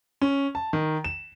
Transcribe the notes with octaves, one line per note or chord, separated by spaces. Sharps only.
C#4
A5
D#3
E7